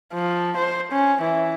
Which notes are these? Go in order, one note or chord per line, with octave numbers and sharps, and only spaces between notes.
F3
C5
C#4
E3